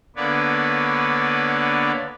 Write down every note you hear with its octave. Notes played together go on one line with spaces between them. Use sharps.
D3 A#3 B3 B4 C#5 D5